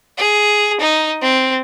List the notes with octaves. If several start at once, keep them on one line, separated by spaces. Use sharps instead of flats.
G#4
D#4
C4